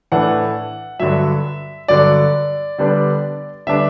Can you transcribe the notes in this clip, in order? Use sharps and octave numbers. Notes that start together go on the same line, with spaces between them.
A2 E3 A3 D4 F#5
G2 D3 F#3 E5
G2 D3 F#3 D5
D3 G3 B3 D4
D3 G3 B3 D4 E5